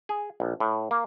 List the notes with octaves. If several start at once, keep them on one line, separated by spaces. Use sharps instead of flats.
G#4
A#1
A2
A#3